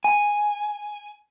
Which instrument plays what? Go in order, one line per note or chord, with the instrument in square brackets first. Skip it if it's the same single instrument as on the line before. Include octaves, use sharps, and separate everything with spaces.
[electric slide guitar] G#5